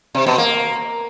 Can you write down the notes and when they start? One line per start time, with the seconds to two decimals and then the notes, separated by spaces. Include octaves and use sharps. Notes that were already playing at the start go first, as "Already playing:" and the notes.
0.15 C3
0.26 B2
0.38 A#3